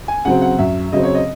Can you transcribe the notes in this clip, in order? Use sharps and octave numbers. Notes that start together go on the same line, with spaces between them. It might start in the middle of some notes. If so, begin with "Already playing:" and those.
G#5
C#3 F#3 C4 F#5
F#5
F#2 E5
C#3 F#3 C4 D#5
C#5
D#5